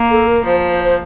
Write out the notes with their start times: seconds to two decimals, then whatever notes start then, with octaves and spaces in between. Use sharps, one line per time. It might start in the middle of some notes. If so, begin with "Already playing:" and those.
Already playing: A#3
0.11 A4
0.27 A#4
0.45 F3 C5
0.71 C5
0.84 C5